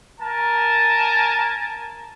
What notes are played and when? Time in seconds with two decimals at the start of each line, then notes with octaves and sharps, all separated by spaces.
0.20 A#4 G#5 A5